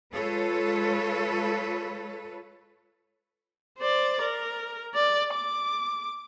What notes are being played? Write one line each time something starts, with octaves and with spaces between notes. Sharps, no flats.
G#3 F4 A4 B4 C#5
C5 D5
A#4
D5
D6